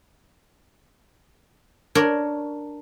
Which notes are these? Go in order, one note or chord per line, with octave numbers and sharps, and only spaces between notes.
D4 A#4 C#5